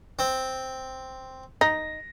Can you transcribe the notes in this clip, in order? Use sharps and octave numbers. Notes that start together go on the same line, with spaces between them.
C4
D#4 A#6